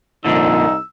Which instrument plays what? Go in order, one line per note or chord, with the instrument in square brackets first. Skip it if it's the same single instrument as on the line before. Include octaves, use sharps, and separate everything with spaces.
[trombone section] C2 D#4 [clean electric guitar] F2 A#2 D3 [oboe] E6